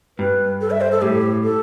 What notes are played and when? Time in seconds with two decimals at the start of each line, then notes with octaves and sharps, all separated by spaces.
0.18 G2 B4
0.61 A4
0.71 E5
0.81 C5
0.91 A4
1.02 A2 G4
1.44 A4